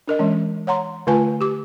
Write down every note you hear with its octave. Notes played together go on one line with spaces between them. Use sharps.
D4 A#4 D#5
E3 G#3 C#4
C#5 F#5 A#5 C6
D3 A3 F4 B4 G#5 A5
G4 D6